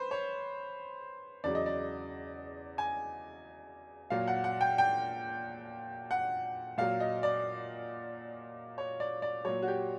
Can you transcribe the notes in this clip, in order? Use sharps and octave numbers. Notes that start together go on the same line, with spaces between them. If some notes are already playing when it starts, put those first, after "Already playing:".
Already playing: B4 C5
C#5
E2 C#3 F#3 D5
D#5
D5
G#5
A#2 F#3 F5
F#5
F#5
G5
G5
F#5
A#2 F#3 F5
D#5
D5
C#5
D5
D5
A#2 F#3 C#5
F#4
G4